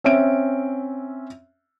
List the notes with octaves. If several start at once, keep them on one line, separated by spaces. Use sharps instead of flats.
C4 C#4 E5 D7